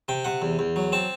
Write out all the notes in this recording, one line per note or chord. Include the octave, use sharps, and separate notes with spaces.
C3 G5
C3 F#5
E2
E2
F#3
C4 A5